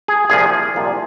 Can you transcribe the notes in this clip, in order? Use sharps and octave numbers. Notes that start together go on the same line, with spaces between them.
G#4
C2 A#2 F3 G#4
C2 A#2 F3